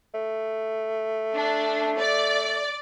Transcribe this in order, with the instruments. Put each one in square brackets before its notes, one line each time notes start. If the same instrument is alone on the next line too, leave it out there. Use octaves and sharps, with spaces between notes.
[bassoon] A3
[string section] D4
D5